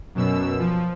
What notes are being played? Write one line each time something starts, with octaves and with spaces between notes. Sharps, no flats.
F#2 B2 E6
F3